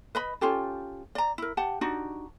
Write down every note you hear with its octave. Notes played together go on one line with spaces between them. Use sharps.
B4 D#5 B5
C#4 F4 G4 A4
D5 A#5
E4 A#4
G4 F#5 A5
D4 D#4 F#4 G4